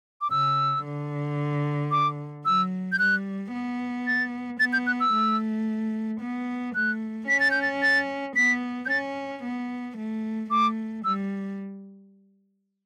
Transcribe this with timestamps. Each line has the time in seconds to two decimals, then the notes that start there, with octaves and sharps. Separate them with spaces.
0.21 D6
0.31 C#3 E6
0.84 D3
1.91 D6
2.45 F#3 E6
2.92 G6
2.99 G3 F#6
3.53 B3
4.07 A6
4.60 B3 A6
4.73 G6
4.87 F#6
5.00 E6
5.14 A3
6.21 B3
6.75 A3 F#6
7.28 C#4 B6
7.40 A6
7.51 G6
7.62 A6
7.82 A6
8.36 B3 B6
8.86 G6
8.89 C#4 A6
9.43 B3
9.97 A3
10.50 A3 D6
11.04 G3 E6